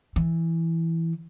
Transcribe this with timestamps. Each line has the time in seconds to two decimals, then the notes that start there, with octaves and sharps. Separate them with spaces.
0.16 E3